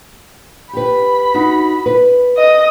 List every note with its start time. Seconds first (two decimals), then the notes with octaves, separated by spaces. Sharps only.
0.73 G4 B4 B5
1.34 D#4 F#4
1.86 B4
2.37 D#5 D#6